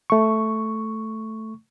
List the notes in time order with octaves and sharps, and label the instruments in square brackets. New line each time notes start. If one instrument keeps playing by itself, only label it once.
[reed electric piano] A3 C#6